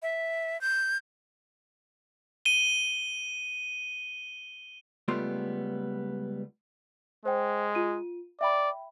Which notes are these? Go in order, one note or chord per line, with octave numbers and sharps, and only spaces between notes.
E5
G6
D#7 G7
C#2 G3 A3 B3 F4 C6
G#3 C5 G5
F4 D#7
D5 E5 G5 B5